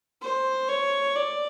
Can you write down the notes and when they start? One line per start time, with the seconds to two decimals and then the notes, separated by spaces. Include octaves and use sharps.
0.22 C5
0.69 C#5
1.15 D5